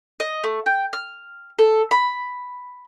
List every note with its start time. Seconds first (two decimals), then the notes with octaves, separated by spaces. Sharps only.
0.20 D#5
0.44 A3
0.66 G5
0.93 F6
1.59 A4
1.91 B5